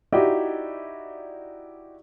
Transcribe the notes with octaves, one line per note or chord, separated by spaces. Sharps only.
D#4 E4 F#4 G4 D5 D#5